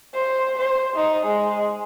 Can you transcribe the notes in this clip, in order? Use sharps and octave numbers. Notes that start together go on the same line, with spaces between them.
C5
C5
D#4
G#3